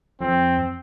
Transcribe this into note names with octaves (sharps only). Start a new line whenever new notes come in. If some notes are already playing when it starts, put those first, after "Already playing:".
F2 C4